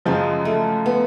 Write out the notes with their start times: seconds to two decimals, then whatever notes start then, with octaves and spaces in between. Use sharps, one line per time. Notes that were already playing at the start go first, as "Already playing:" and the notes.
0.06 F#2 C#3 F3 G#3
0.45 A3
0.86 B3